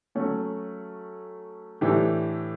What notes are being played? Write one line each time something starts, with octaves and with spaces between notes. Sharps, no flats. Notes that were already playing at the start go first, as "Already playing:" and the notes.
F#3 A3 C#4 F#4
A2 E3 A3 D4 G4